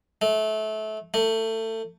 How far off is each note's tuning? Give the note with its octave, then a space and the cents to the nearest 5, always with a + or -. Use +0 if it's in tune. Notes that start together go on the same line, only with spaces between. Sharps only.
A3 -25
A3 +25